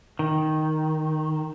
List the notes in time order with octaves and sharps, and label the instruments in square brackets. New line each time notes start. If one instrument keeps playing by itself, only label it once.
[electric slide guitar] D#3